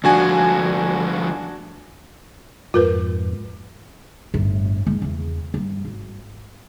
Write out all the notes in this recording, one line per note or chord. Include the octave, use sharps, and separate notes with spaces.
D2 F3 D4 F#4 G#5
F2 G#2 F4 A#4 B4
G1 A2
D#2 G#3
E2 C#3
G2
G#1